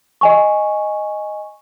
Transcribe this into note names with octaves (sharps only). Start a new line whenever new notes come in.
D#5 G#5 C#6